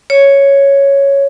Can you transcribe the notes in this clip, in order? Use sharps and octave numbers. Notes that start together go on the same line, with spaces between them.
C#5